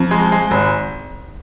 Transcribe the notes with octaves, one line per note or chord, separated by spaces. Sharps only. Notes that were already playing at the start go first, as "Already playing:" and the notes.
Already playing: F2
G#3
G#3
G#1